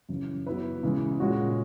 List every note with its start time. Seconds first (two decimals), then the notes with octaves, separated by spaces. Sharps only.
0.09 F#2 C#3 E3
0.46 F#3 B3 E4 B4
0.83 C#3 E3 G#3
1.20 A#2 G#3 C#4 F#4